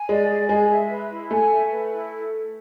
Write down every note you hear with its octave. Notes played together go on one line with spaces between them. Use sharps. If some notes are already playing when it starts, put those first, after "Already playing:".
Already playing: G#5
G#3 D5
G#4
G#3 G#5
E5
B4
E4
A3 G#5
E5
B4
E4